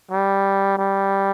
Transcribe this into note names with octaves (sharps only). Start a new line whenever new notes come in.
G3
G3